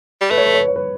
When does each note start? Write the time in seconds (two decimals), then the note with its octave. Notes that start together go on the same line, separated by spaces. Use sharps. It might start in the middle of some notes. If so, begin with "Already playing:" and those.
0.21 G3
0.30 A3 B4
0.38 C#5
0.46 B4
0.54 C#5
0.60 B4
0.68 C#5
0.76 B4